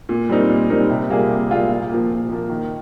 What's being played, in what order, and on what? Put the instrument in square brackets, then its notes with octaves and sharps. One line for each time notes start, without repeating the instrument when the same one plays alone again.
[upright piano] A#2
G3 C4 D#4 A#4
A#2
G3 C4 D#4 A#4
C3
G3 A#3 F4 G#4
C3
G3 A#3 F4 G#4
A#2
F3 A#3
A#2
F3 A#3
D#3